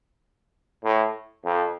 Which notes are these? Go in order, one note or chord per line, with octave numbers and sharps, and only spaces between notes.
A2
F2